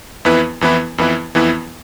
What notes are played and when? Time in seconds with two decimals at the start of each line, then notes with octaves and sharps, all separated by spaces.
0.25 F2 E3 B3 E4 B4
0.61 F2 E3 B3 E4 B4
0.98 F2 E3 B3 E4 B4
1.35 F2 E3 B3 E4 B4